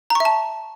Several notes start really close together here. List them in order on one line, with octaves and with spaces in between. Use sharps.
A#5 C#6 E5 A5